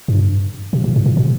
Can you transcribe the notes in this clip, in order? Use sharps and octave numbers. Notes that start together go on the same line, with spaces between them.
G2
B2
A2
G2
A2
B2